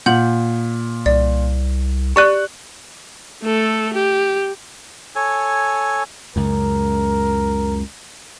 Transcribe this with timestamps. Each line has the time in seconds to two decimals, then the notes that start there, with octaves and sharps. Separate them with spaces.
0.06 A#2 F#5 G6 F#7
1.06 C2 D5
2.16 G4 D5 C#6 F#6 D#7
3.43 A3 A4
3.94 G4
5.16 A4 C#5 G#5
6.36 C#2 F#2 A#4